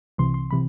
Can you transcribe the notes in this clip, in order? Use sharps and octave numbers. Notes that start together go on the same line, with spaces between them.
C2 C3 E3 C6
C6
C3 E3 B5